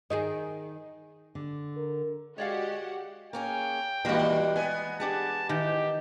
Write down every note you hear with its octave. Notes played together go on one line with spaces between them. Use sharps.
D#3 D#4 G#4 D#5
D3
A#4
G#3 F#4 G4 C#5 D5 F5 F#5
A#3 C#4 G#4 G5
D#2 A#2 E3 G3 G#3 A#3 F#4
B3 G#5
D4 G4 G#4 A5
D#3 E3 G4